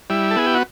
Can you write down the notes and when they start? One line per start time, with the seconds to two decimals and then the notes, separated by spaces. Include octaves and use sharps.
0.10 G3 E4
0.31 A4
0.36 B3 G#4
0.47 G4
0.55 F#4